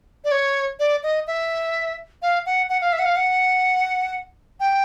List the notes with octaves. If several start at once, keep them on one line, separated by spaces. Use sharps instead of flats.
D5
C#5
D5
D#5
E5
F5
F#5
F#5
F5
E5
F#5
F5
F#5
G5